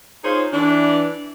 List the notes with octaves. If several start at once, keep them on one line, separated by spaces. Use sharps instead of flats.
D#4 F4 G#4 C5 C#5
E3 D4